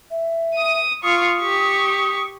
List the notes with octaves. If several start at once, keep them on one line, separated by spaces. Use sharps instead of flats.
E5
D#6 D#7
F4 C#6 D#6
G4 C#6